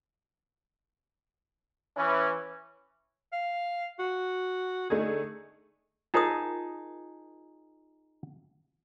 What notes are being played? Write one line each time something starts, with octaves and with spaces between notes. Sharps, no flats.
E3 C#4
F5
F#4
D3 A3 D#4 G#4
D#4 F4 G#4 A#4 A5 D#6